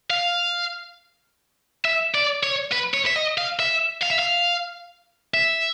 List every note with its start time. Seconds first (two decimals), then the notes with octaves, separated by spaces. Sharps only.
0.10 F5
1.85 E5
2.14 D5
2.43 C#5
2.72 B4
2.94 C#5
3.07 E5
3.16 D#5
3.38 F5
3.59 E5
4.03 F5
4.11 E5
4.19 F5
5.34 E5